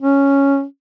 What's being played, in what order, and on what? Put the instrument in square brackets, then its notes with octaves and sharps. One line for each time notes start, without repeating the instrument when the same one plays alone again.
[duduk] C#4